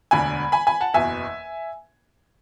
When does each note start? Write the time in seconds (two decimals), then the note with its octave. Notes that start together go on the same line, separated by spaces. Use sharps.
0.11 E1 D2 D3 G#5 B5
0.52 G#5 B5
0.67 G#5 B5
0.81 F#5 A5
0.94 F#1 E2 B2 E5 G#5